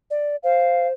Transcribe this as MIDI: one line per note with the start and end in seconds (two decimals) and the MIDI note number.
0.11 0.36 74
0.44 0.93 72
0.44 0.87 77